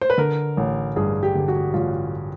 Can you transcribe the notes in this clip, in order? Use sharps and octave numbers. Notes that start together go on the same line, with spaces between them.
C5
B4
D3 A#4
A1
G2 G#4
G4
D3
F#4
A1 F4